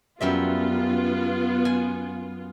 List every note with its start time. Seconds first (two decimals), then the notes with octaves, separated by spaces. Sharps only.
0.21 F#2 G3 B3 F4 E5
1.65 G#5